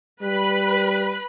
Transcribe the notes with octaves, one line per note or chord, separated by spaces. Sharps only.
G3 B4 B5